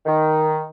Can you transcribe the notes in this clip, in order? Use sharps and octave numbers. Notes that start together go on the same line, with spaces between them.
D#3